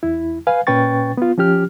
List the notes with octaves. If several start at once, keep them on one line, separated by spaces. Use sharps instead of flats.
E2 E4
B4 F5 G#5
A#2 C#4 B4 G5 C#6 A6
B3 F4
F3 C#4 G4 F6